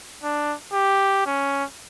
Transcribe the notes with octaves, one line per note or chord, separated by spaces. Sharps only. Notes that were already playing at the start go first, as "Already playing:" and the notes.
D4
G4
C#4